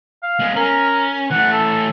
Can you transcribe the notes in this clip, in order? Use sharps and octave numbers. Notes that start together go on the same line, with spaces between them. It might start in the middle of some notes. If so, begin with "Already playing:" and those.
F5
G#3 B3
C#4 A#4
E3 A3 F#5
A4